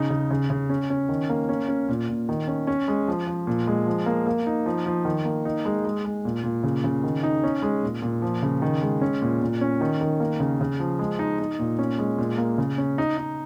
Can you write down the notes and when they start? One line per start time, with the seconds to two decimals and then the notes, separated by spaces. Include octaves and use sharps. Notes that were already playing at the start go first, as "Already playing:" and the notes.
Already playing: C#3 D#4
0.10 C#3
0.31 C#3
0.50 C#3
0.70 C#4
0.90 C#4
1.09 D#3
1.29 A#3
1.49 C#4
1.68 C#4
1.89 A#2
2.09 A#2
2.29 D#3
2.48 C#4
2.67 C#4
2.88 G#3
3.08 F3
3.27 F3
3.47 A#2
3.67 G#3
3.87 F3
4.06 A#3
4.27 A#3
4.46 D#4
4.66 F3
4.86 F3
5.05 D#3
5.25 A#3
5.45 D#4
5.65 G#3
5.85 G#3
6.05 G#3
6.25 A#2
6.44 A#2
6.63 C#3
6.84 C#3
7.04 D#3
7.23 D#4
7.44 C#4
7.62 G#3
7.83 A#2
8.02 A#2
8.22 F3
8.43 C#3
8.62 D#3
8.82 G#3
9.01 C#4
9.22 A#2
9.42 A#2
9.61 C#4
9.81 D#3
10.01 D#3
10.20 A#3
10.40 C#3
10.61 C#3
10.80 F3
10.99 G#3
11.19 D#4
11.39 D#4
11.59 A#2
11.79 C#4
11.99 G#3
12.18 A#2
12.38 A#3
12.58 C#3
12.78 C#4
12.98 D#4
13.17 D#4